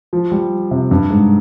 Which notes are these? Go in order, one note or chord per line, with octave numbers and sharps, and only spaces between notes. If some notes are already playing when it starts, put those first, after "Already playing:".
F3
G3
C3
G2
G#2